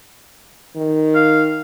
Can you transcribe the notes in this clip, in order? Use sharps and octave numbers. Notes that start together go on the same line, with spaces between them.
D#3
F5